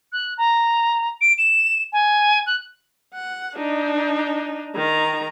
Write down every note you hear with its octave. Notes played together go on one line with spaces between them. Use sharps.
F#6
A#5
D7
E7
G#5
F#6
F#5
D4 D#4
D#3 A#5